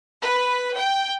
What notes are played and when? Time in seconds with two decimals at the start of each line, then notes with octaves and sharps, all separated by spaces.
0.21 B4
0.76 G5